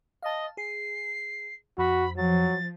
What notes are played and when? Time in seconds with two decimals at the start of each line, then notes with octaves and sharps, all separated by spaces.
0.23 D#5 F5 A5
0.57 G#4 C7
1.78 F2 F#4 B5
2.17 F3 F#3 A6